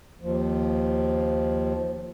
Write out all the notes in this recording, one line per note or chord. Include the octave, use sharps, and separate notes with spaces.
D#2 F3